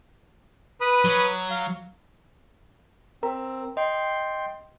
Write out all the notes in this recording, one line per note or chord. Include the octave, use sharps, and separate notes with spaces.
B4 B5 D#6
F#3
F5
C4 A#4 A#5
D#5 G5 C6